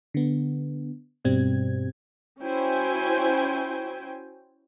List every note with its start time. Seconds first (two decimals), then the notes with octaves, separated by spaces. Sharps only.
0.14 D3 B3
1.25 G2 B2 G3 C4 G#6
2.40 C#4 E4 F#4 C5 G5 G#5